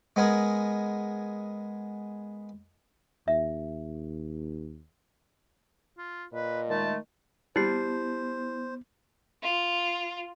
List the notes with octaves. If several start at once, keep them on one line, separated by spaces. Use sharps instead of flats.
G#3 B3 G#4 A#4
D#2 E5
F4
A#2 B4 D#5
D#3 G#3 A3 A5
G3 B3 E4 C5 C7
F4